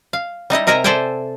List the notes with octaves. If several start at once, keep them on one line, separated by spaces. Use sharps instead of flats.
F5
G3 D#4 E4 D#5
C3 A#4 D#5 E5 G#5 A#5
A4 C5 D5 E5 G5 G#5